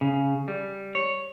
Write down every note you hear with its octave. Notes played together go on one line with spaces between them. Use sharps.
C#3
G3
C#5